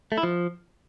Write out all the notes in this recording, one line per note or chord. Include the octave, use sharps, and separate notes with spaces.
A3
E4
F3